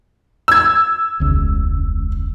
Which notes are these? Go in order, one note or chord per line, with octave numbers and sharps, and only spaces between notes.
E6 G#6
E1 C#2